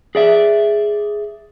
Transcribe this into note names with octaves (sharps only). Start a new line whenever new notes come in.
G#4 D5 E5